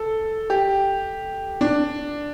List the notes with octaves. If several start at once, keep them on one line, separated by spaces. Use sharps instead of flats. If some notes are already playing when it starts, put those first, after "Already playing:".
Already playing: A4
G4
D4